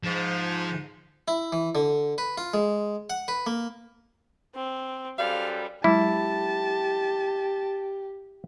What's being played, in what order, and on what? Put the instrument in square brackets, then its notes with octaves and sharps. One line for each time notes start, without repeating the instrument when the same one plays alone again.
[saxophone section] G#2 [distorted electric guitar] F3
[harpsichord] E4
E3
D3
B4
F4
G#3
F#5
B4
A#3
[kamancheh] C4
[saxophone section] F#2 G3 [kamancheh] A4 C5 [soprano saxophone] F5
[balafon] F#3 G#3 [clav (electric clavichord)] E4 [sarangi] G4 [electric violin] A5